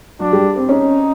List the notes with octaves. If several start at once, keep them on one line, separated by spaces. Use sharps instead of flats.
F#3 D4 F#4
G3 G4
C4 C5
C#4 D#4 C#5